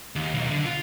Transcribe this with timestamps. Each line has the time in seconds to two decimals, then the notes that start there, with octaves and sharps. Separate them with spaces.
0.16 D#2
0.34 B1
0.51 D3
0.65 F4